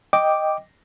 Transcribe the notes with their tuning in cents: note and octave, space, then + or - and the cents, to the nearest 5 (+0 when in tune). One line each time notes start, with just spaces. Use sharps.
D#5 +0 G5 +0 D6 +0